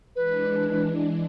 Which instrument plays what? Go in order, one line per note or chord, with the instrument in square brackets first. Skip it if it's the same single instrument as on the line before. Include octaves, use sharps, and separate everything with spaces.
[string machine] E3 G#3 D4 [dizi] B4